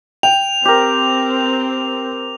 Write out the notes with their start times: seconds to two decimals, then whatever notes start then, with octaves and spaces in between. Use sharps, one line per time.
0.23 G5 F7
0.65 C4 G4 A#4